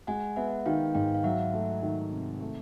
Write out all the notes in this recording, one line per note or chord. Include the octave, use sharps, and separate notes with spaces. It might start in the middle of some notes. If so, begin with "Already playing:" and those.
G#3 F#5 G#5
B3 E5 F#5
D#3 F5 G5
G#2 F5 G5
F5
F#3 E5 F#5
A3
D#3
C3
A3